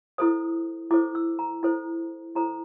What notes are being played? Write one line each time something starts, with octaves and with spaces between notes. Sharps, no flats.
E4 A4 C5 D#6
E4 A4 C5 D6
E6
A#5
E4 A4 C5
E4 A4 C5 A#5